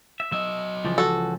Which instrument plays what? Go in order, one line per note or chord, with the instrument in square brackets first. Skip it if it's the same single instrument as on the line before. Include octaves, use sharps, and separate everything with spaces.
[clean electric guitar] E5
[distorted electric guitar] F#3 D#5 [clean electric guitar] E5
[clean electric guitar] C#2 E3 F3
[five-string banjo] F#4 A4